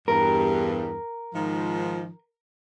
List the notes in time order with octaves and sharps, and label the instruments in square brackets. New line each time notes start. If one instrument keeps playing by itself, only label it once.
[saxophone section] E2 G2 [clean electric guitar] A#4
[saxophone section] G#2 D#3 F3